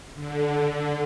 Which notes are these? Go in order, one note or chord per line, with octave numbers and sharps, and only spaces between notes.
D3